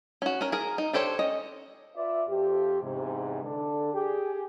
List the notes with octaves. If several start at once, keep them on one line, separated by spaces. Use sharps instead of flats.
C#4 F#4
C#4 A#4
G#4 A#4
D#4
D4 G4 A4 C5 C#5
C#4 D#5
F4 B4 D5 E5
F2 G4
E2 G#2 C3
D3 D4 A4
G4 G#4